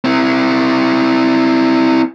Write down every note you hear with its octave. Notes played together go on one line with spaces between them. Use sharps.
C4 E4